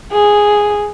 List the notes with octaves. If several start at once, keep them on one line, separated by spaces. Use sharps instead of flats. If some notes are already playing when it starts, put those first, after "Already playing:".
G#4